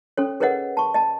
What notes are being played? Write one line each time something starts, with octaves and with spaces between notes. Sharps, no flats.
C#4 A4 C#5
G#4 A#4 B4 C#5 D#5 F#5
A5 C#6
D#5 A5